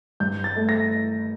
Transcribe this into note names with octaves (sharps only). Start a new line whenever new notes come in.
G2 G6
A6
A3
A#6